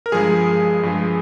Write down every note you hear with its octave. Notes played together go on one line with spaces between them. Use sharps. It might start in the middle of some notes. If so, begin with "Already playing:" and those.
A#4
G2 F3 G#3 G#4
G2 F3 G#3